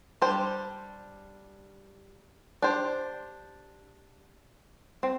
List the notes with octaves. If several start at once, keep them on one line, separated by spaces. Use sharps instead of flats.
G3 D4 G4 C5
D4 G4 C5
C4